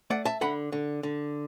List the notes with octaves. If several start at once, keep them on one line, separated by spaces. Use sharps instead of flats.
A3 D5 F#5
E5 A5
D3 F#5 B5
D3
D3